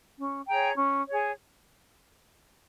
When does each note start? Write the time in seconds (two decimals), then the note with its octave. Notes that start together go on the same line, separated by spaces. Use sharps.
0.18 C#4
0.48 G#4 C#5 G5 A#5
0.78 C#4
1.08 G#4 C#5